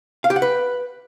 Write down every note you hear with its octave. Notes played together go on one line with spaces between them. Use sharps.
F5
G4
F#5
B4